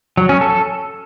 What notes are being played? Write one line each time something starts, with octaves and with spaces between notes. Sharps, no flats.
F#3
C#4
A4